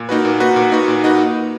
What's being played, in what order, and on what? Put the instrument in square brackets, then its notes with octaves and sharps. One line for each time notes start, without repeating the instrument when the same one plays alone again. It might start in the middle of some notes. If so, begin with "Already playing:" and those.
Already playing: [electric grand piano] A#2
A#3 D#4 F#4 B4
A#2
A#3 D#4 F#4 B4
A#2
A#3 D#4 F#4 B4
A#2
A#3 D#4 F#4 B4